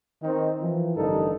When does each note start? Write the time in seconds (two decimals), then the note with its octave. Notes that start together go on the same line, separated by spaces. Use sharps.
0.23 D#3 C4 D#4
0.61 E3 F3
0.96 A1 G2 D3 D#4 A4 A#4